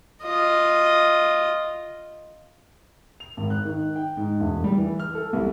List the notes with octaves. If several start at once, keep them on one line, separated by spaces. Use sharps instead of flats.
F4 D#5
F7
G#1
F#6
D#3
G5
G#2
E1
G3
E3
F6
A4
C2